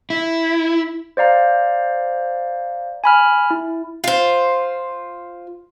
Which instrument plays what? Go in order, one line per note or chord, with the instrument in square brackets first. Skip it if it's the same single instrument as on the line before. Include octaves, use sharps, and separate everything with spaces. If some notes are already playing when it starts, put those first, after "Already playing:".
[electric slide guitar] E4
[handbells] C5 D5 F5 A#5
G#5 B5 F6
E4
[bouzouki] F4 C5